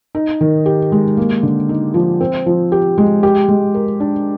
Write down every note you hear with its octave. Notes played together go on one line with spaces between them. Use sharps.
D#4
D#3
G4
G#3
A#3
D3
D#4
F3
C4
F3
G4
G#3
G4
G#3
A#4
D4